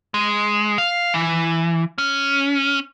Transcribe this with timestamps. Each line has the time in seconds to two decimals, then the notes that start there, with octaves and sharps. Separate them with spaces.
0.14 G#3
0.78 F5
1.14 E3
1.98 C#4